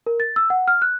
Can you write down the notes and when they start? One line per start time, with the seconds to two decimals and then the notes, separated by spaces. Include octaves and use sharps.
0.06 A#4
0.20 A6
0.36 E6
0.50 F#5
0.68 F6
0.82 F#6